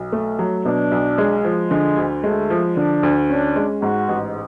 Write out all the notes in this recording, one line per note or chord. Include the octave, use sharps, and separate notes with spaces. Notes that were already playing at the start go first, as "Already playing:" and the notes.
Already playing: B1
A3
F#3
B2 D4
B1
G#3
F3
D3 G#3
D2
G#3 A3
F3
D3 D4
D2
C#4 D4
G#3
G#2 F#4
A1